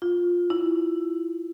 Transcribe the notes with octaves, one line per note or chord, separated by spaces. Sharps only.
F4
E4